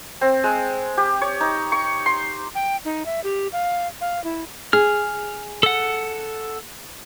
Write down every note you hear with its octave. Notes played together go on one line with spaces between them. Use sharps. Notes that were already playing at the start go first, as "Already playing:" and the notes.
C4
G#3
G4
C#5
D#4
C#6
C6
G5
D#4
E5
G4
F5
F5
E4
G#4 F6
A4 F#5